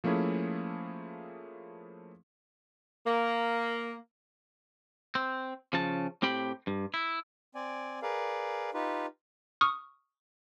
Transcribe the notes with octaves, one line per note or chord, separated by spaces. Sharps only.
F3 A3 A#3 C#4 E4 G#4
A#3
C4
C#3 F3 C#4 A5
A2 C4 G4 G5 B5
G2
E4
C4 D5 G#5
G#4 A#4 B4 D5 F5
D#4 F4 G4 B4
C#6 D#6 F6